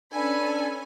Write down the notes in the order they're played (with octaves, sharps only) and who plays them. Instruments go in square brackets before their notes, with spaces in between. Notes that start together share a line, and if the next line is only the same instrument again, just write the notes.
[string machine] C#4 [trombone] D4 [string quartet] A4 B4 B5 [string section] G#5